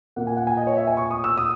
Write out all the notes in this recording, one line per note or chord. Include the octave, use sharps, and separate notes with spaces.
A#2 A#3 F#5
G#5
F#5
G#5
D#5
C#5
E5
G#5
C#6
D#6
E6
D#6